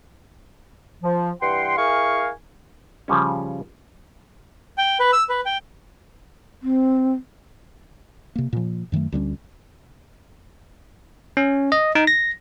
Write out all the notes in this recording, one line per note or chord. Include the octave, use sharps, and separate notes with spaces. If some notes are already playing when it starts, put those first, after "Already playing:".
F3
G2 E3 F#5 G5 C6
E4 G#4 A#4 F5 G#5 C#6
C#3 F3 G3 C#4
G5
B4
E6
B4
G5
C4
C3 A#3
A#2 F3
F#2 D#3 F#3 A3
D2 G3 G#3 C#4
C#4
D#5
D#4
A#6